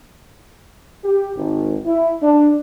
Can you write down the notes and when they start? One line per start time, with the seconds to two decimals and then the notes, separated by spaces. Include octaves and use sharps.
1.04 G4
1.36 G#1
1.86 E4
2.21 D4